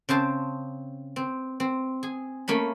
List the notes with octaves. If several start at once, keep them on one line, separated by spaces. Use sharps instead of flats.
C#3 C4 C5 A5
C4
C4
G#4
A3 A#3 C#4 B5